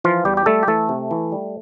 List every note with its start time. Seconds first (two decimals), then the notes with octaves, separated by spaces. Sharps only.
0.04 E3 F3 F4
0.25 E2 G3 G4
0.37 G4
0.46 G3 A3 A4
0.63 G4
0.68 E3 A3 A4
0.89 C3
1.11 E3
1.32 G3